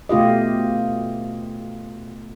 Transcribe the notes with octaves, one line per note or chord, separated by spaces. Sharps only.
B2 A3 F4 G4 D#5